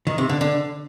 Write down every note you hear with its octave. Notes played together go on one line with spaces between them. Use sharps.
D#3
C3
D3
D3